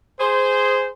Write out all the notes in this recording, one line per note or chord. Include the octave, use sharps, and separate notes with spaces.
G#4 C5